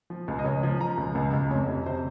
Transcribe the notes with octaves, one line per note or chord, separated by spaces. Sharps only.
F3
C#2
D#5
C#2 C#5
F3
F3 A#5
C#2
C#2
C#2
F2 C#5
C3
C3 C5